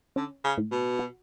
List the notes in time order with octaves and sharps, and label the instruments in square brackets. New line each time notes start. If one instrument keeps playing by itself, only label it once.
[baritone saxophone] D3 [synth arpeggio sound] C#4
[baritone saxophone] C#3
[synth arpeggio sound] A2
[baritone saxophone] B2
[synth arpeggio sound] F#4